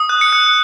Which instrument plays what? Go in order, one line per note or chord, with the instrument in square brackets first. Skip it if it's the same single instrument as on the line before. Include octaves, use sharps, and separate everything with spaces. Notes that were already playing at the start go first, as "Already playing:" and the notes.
Already playing: [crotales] D#6
F#6
C#7
F#6